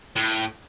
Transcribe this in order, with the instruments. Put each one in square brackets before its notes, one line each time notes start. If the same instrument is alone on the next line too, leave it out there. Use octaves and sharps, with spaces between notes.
[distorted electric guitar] A2